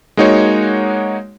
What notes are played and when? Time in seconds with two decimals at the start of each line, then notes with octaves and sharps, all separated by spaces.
0.17 G#3 A#3 D#4 F#4 C#5 F#5